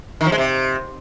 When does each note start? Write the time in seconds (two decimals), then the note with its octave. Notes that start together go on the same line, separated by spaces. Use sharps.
0.21 D#3
0.26 F3
0.32 G#3
0.38 C3